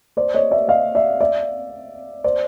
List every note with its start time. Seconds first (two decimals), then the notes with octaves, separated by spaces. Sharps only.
0.17 C5 D5
0.34 C#5 D#5
0.51 D5 E5
0.68 D#5 F5
0.95 D5 E5
1.20 D5 E5
2.24 C5 D5